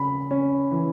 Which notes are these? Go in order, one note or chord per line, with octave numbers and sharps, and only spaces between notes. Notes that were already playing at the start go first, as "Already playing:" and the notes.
Already playing: C#3 B5
C#4
E3